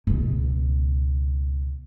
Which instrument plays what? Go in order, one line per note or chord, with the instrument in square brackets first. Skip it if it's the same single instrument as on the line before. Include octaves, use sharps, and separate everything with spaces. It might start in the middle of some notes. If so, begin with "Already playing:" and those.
[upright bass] C#2 B2